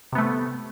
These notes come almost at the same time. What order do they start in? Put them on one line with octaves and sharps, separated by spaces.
C3 B3 A3